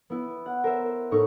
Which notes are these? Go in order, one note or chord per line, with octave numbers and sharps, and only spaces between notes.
B3 E4
F#5
A#4 C5 E5
A2 A3 D#4 C#6